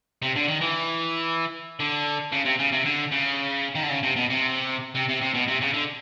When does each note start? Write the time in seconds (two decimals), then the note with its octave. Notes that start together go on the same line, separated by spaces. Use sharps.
0.22 C3
0.36 D3
0.48 D#3
0.61 E3
1.80 D3
2.32 C#3
2.45 C3
2.59 C#3
2.72 C3
2.85 D3
3.12 C#3
3.75 D#3
3.83 D3
3.89 C#3
4.03 C3
4.16 B2
4.30 C3
4.95 C3
5.09 C3
5.21 C3
5.34 B2
5.48 C3
5.61 C#3
5.74 D3